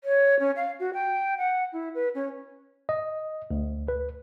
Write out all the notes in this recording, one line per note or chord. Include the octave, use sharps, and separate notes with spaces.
C#5
C#4
F5
F#4
G5
F#5
E4
B4
C#4
D#5
D2
B4